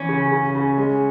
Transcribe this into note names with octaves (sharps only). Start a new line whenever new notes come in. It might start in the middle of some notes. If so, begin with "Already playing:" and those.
Already playing: E3 C#4
C#3
C#3
C#3
G#3